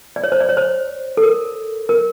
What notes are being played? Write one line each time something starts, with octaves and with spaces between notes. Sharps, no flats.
D5
C#5
C5
D5
C#5
C5
A4
A#4
A#4